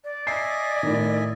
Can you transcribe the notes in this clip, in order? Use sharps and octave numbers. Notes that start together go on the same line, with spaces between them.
D5
D#5 E5 G#5 C7
A2 D#3